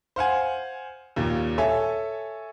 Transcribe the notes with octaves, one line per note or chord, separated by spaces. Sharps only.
C5 F5 F#5 G#5
D#2 A#2
A4 C#5 E5 G#5